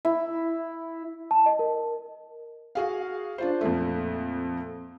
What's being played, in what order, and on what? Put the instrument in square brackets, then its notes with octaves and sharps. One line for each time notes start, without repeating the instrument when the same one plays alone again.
[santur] E4
[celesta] A5
D#5
A#4
[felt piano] F#4 G#4 F5
D4 F4 C5
F2 A#2 A3